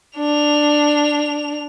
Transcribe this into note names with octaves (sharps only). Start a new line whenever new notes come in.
D4 F7